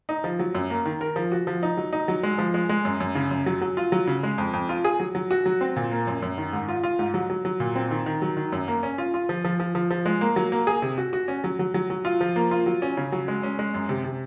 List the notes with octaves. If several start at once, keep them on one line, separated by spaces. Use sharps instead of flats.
D#4
F3
F#3
F#2
A#3
D#3
A#4
F3
F#4
F3
D#4
F#3
D#4
F#3
G#3
F3
G#3
G#3
F#2
F#2
C#3
F#2
F#3
F#3
F4
F#3
C#3
G#3
F2
F2
F4
G#4
F#3
F#3
F#4
F#3
C4
A#2
A#3
F#2
F#2
D#3
G#2
F4
F4
G#2
F#3
F#3
F#3
A#2
C4
D#3
D#3
F#3
D#3
F#2
A#3
C#4
F4
F4
F3
F3
F3
F3
F3
G#3
A#3
F#3
A#3
G#4
C3
F#4
F#4
C#4
F#3
F#3
F#3
F#3
F4
F3
A#3
F4
F#3
C#4
C#3
F#3
G#3
C#4
G#3
F#2
C3
C3